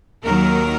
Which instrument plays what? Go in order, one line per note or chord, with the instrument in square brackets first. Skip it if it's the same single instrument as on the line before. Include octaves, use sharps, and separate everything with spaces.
[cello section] D#2 D#3 F#3 A#4